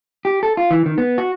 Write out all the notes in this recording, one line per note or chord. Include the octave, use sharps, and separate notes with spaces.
G4
A4
F4
E3
D#3
B3
F#4